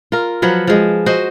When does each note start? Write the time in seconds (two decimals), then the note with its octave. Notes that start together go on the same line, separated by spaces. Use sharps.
0.12 F4 A#4
0.42 F3 F#3 B4 F#5
0.67 F3 G#3
1.06 F#4 C5 D#5